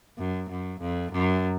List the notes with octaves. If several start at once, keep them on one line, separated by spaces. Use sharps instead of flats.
F#2
F#2
F2
F#2